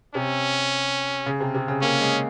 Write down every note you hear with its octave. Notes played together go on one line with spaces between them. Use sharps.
C3 C#4
C#3
C3
C3
C#3
A#3 C#4
G#3